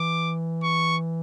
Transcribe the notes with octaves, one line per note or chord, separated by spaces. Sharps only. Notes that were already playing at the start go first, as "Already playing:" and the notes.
Already playing: E3 D6
C#6